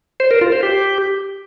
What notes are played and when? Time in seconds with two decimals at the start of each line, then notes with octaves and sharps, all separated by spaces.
0.20 C5
0.31 A#4
0.41 F4
0.52 C5
0.63 G4